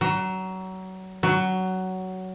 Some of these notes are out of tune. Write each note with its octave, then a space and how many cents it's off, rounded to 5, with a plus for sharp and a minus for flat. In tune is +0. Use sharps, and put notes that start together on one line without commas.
F#3 +25
F#3 +15